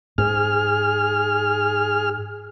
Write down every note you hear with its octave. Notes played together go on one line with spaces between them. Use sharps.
G#2 G#4 F6